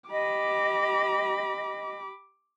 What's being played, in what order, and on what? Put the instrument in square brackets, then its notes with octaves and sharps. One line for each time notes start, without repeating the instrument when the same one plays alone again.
[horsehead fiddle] G4 B5 [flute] D#5 [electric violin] D6